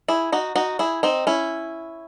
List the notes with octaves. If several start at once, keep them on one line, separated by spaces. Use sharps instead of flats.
E4 G#4
D#4 F#4
D#4 F#4
E4 G#4
C4 D#4
C#4 E4